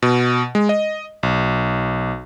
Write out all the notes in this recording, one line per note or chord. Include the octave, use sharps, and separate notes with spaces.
B2
G#3
D#5
B1